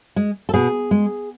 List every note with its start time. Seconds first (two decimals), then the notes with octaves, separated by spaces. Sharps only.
0.16 G#3
0.49 A4
0.54 B2 G#4
0.91 G#3